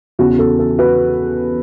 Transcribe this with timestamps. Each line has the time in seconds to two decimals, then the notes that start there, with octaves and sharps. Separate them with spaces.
0.19 E2 C#3 E3 C#4 F#4
0.39 A4
0.59 A4
0.79 F#4 B4